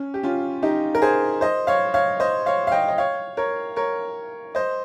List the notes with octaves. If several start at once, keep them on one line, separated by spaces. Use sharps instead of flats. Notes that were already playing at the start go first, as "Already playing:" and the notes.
Already playing: C#4
G4
C#4 F4
D#4 G4
A#4
G#4 C5
C5 D#5
C#5 F5
C#5 F5
C5 D#5
C#5 F5
F5
D#5 G5
D#5
C#5 F5
A#4 C#5
A#4 C#5
C5 D#5